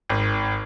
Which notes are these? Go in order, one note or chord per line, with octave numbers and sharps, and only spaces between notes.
G#1